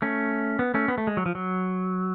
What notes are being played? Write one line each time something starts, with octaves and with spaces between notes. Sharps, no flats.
A3 C#4
B3
A3 C#4
B3
A3
G#3
F#3
F3
F#3